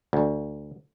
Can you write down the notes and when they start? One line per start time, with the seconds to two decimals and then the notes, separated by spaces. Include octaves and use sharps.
0.13 D2